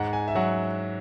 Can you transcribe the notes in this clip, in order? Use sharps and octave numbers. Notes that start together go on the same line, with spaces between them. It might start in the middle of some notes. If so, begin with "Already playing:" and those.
Already playing: G#2 F#5
G#5
E5
F#3 F#5